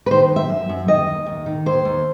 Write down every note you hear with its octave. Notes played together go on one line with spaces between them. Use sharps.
B4
D#3 C5
F#2
E5
F#2
F#2
D#3 D#5
D#2
D#2
D#3
D#2 C5
D#2